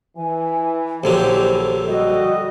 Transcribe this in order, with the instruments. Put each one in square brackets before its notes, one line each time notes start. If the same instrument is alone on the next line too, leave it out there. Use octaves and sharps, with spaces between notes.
[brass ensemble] E3 [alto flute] G#5
[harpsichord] A#1 D3 F#3 [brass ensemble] E3 C5 [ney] G4 [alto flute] A4
[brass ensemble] G3 D#5 [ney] F#4